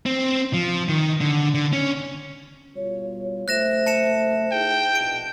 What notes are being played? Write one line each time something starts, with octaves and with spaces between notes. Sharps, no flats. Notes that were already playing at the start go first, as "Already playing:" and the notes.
C4
F3
D#3
D3
D3
C#4
B2 G3 F4 C#5
F#1 A3 C5 E5 F#6 A#6 E7
A5 C#7 E7
D#4 E4 G#4 G5
A#1 B2 D7